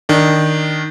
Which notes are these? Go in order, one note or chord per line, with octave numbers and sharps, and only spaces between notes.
D#3 D4